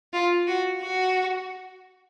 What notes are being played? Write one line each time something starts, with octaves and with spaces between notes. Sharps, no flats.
F4
F#4
F#4